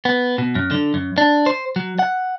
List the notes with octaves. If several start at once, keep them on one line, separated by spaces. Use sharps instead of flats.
B3
B2
F#2
D3
F#2
D4
C5
F#3
F#5